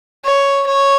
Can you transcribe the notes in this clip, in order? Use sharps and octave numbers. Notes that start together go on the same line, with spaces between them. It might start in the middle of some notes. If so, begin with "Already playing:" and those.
C#5
C#5